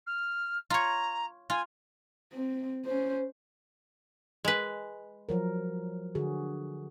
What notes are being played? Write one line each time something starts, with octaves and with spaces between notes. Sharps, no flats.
F6
F4 C#5 A#5
F4 G#5
C4
C#4 C5
G#3 B4
F3 F#3 A#4
D3 F#4 G#4